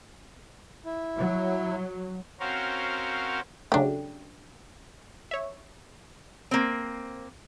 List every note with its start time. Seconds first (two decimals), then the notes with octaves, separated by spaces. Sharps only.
0.85 E4
1.17 F#3
2.40 C4 C#4 F#4 A#4 C5 F5
3.72 C#3 F#3 A3 D4 G4
5.31 C#5 E5
6.51 A#3 C4